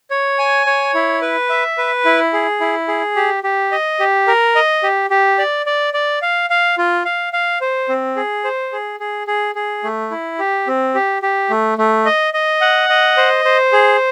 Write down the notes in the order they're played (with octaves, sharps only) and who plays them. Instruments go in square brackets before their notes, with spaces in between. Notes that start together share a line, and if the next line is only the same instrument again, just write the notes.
[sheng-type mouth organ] C#5
G#5
C#5
E4
B4
E5
B4
E4
G#4
E4
G#4
G4
G4
D#5
G4
A#4
D#5
G4
G4
D5
D5
D5
F5
F5
F4
F5
F5
C5
C4
G#4
C5
G#4
G#4
G#4
G#4
A3
E4
G4
C4
G4
G4
A3
A3
D#5
D#5
F#5
D#5
C5
C5
G#4